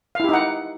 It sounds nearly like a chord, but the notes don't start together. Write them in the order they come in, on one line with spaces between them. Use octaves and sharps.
F5 E4 G4 D#4 F#5